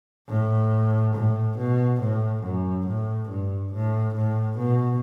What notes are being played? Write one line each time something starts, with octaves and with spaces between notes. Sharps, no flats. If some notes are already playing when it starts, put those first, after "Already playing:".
A2
A2
B2
A2
F#2
A2
G2
A2
A2
B2